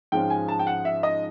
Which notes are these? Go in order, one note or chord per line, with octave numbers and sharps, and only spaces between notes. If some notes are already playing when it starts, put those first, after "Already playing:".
G#2 F3 G#3 C#4 G5
G#5
A5
G5
F#5
E5
D#5